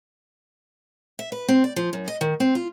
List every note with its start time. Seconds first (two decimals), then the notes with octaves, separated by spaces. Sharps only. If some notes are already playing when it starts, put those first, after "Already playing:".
1.19 E5
1.32 B4
1.49 C4
1.64 D5
1.76 F3
1.93 F#2
2.08 D#5
2.21 D#3
2.40 C4
2.55 F4